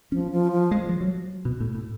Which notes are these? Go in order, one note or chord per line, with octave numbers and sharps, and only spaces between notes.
F3 C#4
F3
F3
G#3
F3
F#3
B2
A2
A2